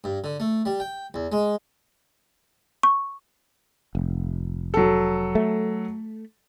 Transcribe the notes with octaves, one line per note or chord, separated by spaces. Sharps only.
G2
D3
A3
G3
G5
E2
G#3
C#6
F1
F#3 A4
A3